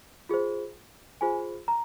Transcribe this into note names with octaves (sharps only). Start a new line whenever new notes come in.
F4 G#4 C5
F4 G#4 C5 G#5
A#5